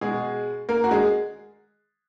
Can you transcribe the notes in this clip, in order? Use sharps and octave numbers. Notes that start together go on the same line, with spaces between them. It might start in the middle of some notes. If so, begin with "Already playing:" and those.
B2 G#3 G#4
A#3 A#4
F#4
G#3 G#4